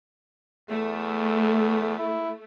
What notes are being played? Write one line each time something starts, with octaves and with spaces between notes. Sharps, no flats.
E2 A3
E4